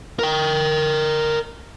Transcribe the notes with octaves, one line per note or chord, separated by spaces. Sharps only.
A#4 G5